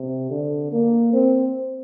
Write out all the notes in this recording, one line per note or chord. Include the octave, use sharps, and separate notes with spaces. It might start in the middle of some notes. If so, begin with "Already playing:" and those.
Already playing: C3
D3
A#3
C4